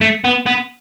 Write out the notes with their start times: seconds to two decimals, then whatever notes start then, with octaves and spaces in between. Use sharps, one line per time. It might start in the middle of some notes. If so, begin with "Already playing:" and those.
0.01 A3
0.24 B3
0.46 B3